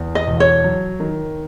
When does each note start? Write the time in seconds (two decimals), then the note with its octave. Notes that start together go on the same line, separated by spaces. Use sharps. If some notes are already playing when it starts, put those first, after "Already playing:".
Already playing: E2
0.15 D#5
0.27 E1
0.40 C#5
0.64 F#3
1.00 D#3